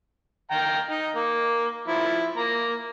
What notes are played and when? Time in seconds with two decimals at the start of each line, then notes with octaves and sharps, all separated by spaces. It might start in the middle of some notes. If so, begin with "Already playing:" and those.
0.51 F5 G5 A#5
0.90 D#4
1.16 A#3
1.88 F3 E4
2.37 A#3 A#5